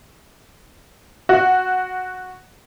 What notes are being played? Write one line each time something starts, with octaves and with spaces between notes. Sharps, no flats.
F#4